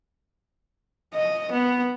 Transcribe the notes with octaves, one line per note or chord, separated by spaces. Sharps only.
D#5
B3